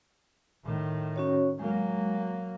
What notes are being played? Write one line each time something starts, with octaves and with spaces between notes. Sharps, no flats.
A2 D#3
C#4 F#4 C#5
F#3 G#3 A#3